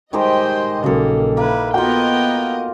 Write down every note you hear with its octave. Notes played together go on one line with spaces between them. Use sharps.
D#3 G3 G#3 G4 C5 D#5 G5
A#1 C#3 F#3 A#3 A4 D#5
A#3 E4 B4
B3 F4 F#4 A#4 D#5 F#5 G5